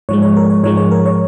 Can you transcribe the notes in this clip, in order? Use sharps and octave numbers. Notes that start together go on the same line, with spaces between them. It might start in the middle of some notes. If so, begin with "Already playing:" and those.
G#2 F3 G#3 C#5
C#5
A#4
C#5
G#2 F3 G#3 C#5
C#5
A#4
C#5